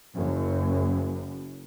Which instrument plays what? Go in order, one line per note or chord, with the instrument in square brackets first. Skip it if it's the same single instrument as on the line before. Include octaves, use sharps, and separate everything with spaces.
[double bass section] F#1 F#2